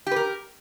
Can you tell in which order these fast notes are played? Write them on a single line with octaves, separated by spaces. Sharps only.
G4 B4 A#4